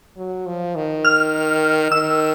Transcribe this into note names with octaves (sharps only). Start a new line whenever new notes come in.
F#3
F3
D#3
F6
D#3 E6